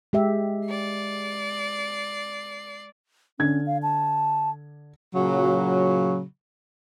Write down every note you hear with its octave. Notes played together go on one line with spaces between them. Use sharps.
G#3 G4 E5
D5 C7
D3 C#4 G#6
F5
A5
A#2 C#3 F#3